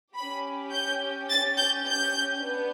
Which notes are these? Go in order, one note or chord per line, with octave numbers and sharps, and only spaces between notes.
C#4 G4 B5
G6
A6
G6
G6
B3 D4